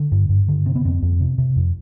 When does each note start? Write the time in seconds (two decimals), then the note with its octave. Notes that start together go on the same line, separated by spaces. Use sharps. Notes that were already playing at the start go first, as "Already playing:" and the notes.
Already playing: D3
0.12 G2
0.29 G2
0.48 D3
0.66 C3 C4
0.75 B3
0.84 F2 C4
1.02 F2
1.20 C3
1.38 C3
1.56 F2